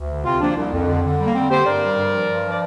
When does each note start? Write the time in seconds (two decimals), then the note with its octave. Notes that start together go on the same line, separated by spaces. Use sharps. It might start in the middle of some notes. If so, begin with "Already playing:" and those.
Already playing: D2
0.09 D3
0.24 C3 C4 F4
0.41 F3 A#3 D4
0.57 C2
0.72 F2
0.87 D3
1.03 D3
1.19 G3
1.25 A#3
1.34 G3 C4
1.50 D3 G4 C5
1.65 G2 A#4 D5
1.82 G3
1.96 G2
2.12 F3
2.29 G2
2.44 F3
2.51 D5